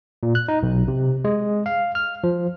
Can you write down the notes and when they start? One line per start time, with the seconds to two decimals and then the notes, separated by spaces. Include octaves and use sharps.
0.23 A#2
0.35 F#6
0.48 D#4
0.63 B1
0.88 C3
1.25 G#3
1.66 F5
1.95 F6
2.24 F3